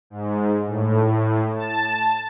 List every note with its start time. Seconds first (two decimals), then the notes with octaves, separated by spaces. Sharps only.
0.10 G#2
0.67 A2
1.56 A5